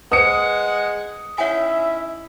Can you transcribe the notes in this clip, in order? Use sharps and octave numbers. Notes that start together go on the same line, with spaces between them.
G#3 B4 C5 F#5 D#6 C#7
C#4 D#4 E4 C#5 E5 F#5 G#5